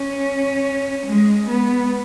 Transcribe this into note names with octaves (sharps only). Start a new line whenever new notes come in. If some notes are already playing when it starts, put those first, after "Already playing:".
Already playing: C#4
G#3
B3